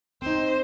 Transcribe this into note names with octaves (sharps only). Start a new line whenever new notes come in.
C4 D#4 C5